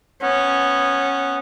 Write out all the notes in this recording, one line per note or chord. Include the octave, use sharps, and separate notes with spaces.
B3 C#4